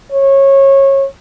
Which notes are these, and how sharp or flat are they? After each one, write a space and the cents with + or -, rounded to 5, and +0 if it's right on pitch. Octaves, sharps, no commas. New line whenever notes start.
C#5 -20